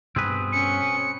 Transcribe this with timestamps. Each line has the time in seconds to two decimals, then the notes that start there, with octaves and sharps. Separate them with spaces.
0.16 G2 B2 C4 G#4 B4
0.52 C#4 C#7